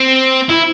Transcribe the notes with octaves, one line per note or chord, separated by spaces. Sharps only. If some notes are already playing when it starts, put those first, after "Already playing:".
Already playing: C4
E4